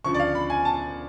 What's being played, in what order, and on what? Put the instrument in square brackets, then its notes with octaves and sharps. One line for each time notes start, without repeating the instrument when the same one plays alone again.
[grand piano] D2 C#3 F3 C#6
D5
F5
B5
G#5
A5